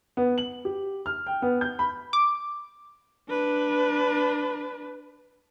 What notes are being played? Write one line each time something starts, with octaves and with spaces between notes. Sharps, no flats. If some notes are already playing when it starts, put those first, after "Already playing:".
B3
F#7
G4
F6
G5
B3
G6
B5
D6
D4 B4